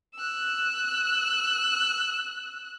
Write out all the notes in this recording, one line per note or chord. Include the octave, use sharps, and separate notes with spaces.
E6 F#6